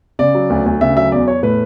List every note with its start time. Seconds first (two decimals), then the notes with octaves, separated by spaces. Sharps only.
0.19 C#3 D5
0.34 F#3
0.50 D2
0.66 D2
0.81 C#3 E5
0.96 F#3 E5
1.12 E2 D5
1.28 E2 C#5
1.43 A2 B4